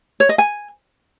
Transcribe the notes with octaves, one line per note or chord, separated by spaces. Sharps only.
C#5
D#5
G#5